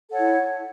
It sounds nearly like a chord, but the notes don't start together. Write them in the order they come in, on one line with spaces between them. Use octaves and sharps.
A4 F#5 C#5 E4